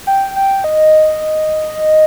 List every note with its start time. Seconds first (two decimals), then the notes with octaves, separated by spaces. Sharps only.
0.07 G5
0.36 G5
0.64 D#5